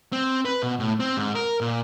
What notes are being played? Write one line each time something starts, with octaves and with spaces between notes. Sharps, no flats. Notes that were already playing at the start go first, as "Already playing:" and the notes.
C4
B4
B2
A2
C4
G#2
A#4
A#2